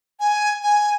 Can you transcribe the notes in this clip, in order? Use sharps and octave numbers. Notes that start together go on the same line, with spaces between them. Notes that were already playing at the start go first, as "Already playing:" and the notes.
G#5
G#5